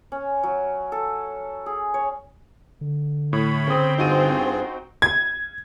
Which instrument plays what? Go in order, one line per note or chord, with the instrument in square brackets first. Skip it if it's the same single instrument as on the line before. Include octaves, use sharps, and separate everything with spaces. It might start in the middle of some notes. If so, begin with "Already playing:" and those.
[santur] C#4
F#3
A4
G#4
C#5
[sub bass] D3
[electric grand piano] A2 [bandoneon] C#5 B5
[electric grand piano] C#3 D#6 [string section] C4 C5 G5
[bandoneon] G2 F4 G#4 [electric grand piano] D#4 F#4 D#7
[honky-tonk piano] G#6